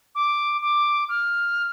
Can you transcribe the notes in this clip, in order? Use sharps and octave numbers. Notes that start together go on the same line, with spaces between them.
D6
D6
F6